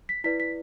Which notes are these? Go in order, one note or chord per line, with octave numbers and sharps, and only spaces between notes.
B6
E4 B4 D5 B6
B6